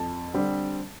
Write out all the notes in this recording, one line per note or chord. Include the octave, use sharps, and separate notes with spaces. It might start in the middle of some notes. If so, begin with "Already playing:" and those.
Already playing: F2 A5
D3 G3 C4